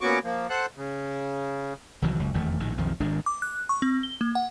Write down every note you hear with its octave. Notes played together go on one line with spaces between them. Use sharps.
A#2 B3 C#4 F#4 C#6 D6
F3 A#3
A4 C5 F#5 F#6
C#3
C2 D#3 E3 F#3
F#1 C#2
F1 E2 D#3 A3
A#1 A2 D#3
B1 F2 D#3 F3
G#1 D#3 G#3 D4
D6
F#6
C#6
C4
G7
A#3
F#5